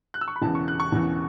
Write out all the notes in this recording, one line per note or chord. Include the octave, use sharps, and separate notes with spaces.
F#6
E6
C#6
B5
E1 E2 C#3 E3 A5
C#6
F#6
C#6
E1 E2 C#3 E3